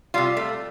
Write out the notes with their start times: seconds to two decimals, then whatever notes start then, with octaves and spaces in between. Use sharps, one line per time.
0.14 C3 G3 F4
0.37 A3